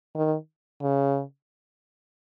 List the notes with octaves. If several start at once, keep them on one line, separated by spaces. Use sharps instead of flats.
D#3
C#3